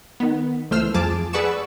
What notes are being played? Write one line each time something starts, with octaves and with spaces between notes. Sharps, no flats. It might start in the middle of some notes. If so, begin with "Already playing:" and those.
D#3 B3
C#2 E3 A3 C5 E6 F6
F2 F3 G#4 A5 D6
G#4 B4 D5 F#5 C#6 E6